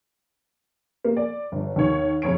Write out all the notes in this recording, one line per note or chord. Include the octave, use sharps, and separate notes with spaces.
A#3
D5
G1
D#2 D#3 C#5 C#6
F#1 F2 C#5 D7